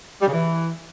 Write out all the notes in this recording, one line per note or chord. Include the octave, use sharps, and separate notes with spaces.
G3
C#3
E3